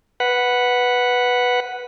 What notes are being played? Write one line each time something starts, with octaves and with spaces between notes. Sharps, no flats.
B4 F#5